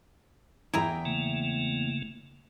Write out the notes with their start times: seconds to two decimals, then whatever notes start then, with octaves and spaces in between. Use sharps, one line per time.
0.73 E2 E4 G#4 E5 G5 A#5
1.05 C#3 A3 A#3